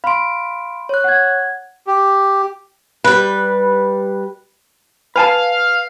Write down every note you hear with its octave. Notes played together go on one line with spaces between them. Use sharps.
F5 B5 C6 D7
C#5 F#6
F#5 G#6
G4
G3 B4
B4 F5 G#5 A5